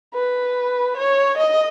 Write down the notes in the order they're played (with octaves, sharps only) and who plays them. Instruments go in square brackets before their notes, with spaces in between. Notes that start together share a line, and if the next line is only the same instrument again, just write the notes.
[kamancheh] B4
C#5
D#5